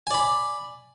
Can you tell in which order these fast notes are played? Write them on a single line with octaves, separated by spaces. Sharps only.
G#5 D5 B5